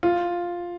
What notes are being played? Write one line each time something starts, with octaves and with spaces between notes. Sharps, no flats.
F4